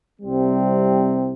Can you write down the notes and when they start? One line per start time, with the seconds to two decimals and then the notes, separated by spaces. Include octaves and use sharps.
0.21 C2 C3 G3 C4